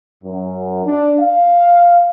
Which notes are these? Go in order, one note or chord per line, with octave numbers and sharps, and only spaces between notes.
F#2
D4
F5